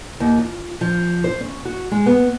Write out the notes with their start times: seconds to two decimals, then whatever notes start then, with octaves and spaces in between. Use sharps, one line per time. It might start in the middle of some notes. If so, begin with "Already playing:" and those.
0.20 D#2
0.38 F4
0.81 F3
1.24 C5
1.41 C#4
1.65 F#4
1.91 G#3
2.06 B3